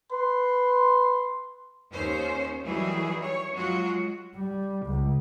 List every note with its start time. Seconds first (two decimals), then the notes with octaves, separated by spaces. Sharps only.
0.12 B4 C6
1.92 D#2 C#4 C5 C#5
2.63 D#3 E3 F#3 G3 G#4
3.22 C#5
3.52 F#3 G#3 F4 F#4
4.35 G3
4.86 C#2